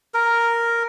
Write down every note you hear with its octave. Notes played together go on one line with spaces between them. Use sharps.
A#4